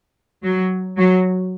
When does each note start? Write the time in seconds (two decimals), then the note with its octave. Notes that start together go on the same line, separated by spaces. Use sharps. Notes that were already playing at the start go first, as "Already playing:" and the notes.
0.43 F#3
0.97 F#3